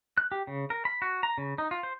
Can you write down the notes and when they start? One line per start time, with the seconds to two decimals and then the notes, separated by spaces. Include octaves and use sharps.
0.18 F#6
0.32 G4
0.47 C#3
0.70 A#4
0.85 B5
1.02 F#4
1.23 A#5
1.38 C#3
1.58 D#4
1.71 F4
1.83 C5